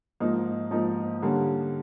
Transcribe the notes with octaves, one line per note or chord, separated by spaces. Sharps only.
G#2 F3 A#3 D#4
G#2 F3 A#3 D#4
D3 G3 A#3 C#4